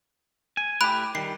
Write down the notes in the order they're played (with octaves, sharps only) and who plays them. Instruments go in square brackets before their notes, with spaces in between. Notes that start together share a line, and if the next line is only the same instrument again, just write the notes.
[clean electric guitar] G#5
[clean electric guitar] A2 G4 [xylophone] B5 F#6 D7
[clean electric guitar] D#3 G3 [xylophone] C7